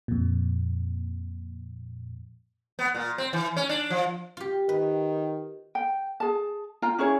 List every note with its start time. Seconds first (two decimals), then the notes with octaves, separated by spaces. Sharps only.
0.08 F2 A#2
2.79 B3
2.95 A#2
3.18 C4
3.33 E3
3.57 C#4
3.69 D4
3.90 F3
4.37 F4 G4
4.69 D#3 B4
5.75 G5
6.20 G#4 A5
6.82 F4 G5 A#5
6.98 C#4 E4 G#4 C#5